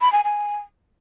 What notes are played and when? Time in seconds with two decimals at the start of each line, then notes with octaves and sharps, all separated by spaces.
0.01 B5
0.12 G#5
0.24 G#5